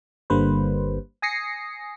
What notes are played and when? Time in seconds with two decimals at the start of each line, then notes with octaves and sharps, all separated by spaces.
0.30 G1 D3 G3 A#3 B4 C5
1.22 G#5 D#6 A#6 C7 C#7